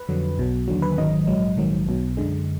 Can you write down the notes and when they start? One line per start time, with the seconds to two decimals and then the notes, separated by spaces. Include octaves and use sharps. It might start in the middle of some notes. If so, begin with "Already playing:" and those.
Already playing: B4
0.09 F2 D3 F#3
0.38 B1 B2 F#3
0.68 D#2 D3 F#3
0.82 B4
0.97 G#1 F#2 D#3 F#3 D#5
1.27 A#1 G#2 F#3
1.57 A#1 G#2 D#3 F#3
1.87 B1 B2 F#3
2.17 F#2 D3 G#3